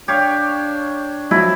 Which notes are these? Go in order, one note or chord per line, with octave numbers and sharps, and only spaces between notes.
D4 G4 C#5 F5
F3 F#3 E4